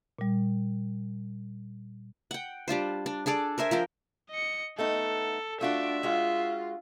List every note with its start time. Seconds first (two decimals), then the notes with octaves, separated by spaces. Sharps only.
0.19 A#2 G3
2.31 F#5 G5
2.68 G3 D4 F4 C5
3.06 D4
3.26 D4 G#4 A4 D5
3.58 A#4 C5 E5 G#5
3.71 F3 A#4 G5
4.30 D#5 C#7
4.78 A3 B3 D#4 A4
5.61 A3 D4 F4 F#4 E5
6.03 G#3 F4 F#4